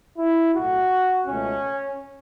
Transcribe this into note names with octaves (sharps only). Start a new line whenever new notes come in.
E4
B1 A2 A3 F#4
C#2 B2 A3 C#4